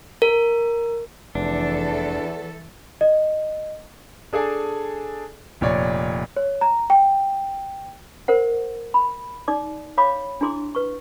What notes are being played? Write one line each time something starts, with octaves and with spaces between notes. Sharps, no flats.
A#4
F1 E2 E3 D4 A4
D#5
D4 G#4 A4 D5 G#5
F1 A#2 C#5 D5
C#5
A#5
G5
A#4 C5 F#5
B5
D#4 D5 D6
C#5 F5 B5 D6
D4 E4 G#4 C6 D6
B4 C#6